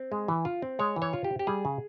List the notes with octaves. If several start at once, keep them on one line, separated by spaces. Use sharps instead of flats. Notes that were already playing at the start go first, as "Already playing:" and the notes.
Already playing: C4
G#3
E3
F4
C4
G#3 C#5
E3
C#5
F4
G4
C4
G4
G3 G#4
C#3